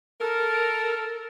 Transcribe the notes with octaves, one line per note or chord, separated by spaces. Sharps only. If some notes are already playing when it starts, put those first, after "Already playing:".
A4 A#4